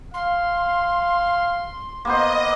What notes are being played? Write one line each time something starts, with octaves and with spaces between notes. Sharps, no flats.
F5 C6
A#3 B3 C5 D#5